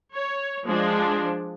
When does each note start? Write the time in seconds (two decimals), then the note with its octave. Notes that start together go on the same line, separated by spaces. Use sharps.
0.13 C#5
0.65 F3 G#3 D4